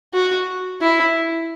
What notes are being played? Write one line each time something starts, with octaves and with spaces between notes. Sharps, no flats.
F#4
E4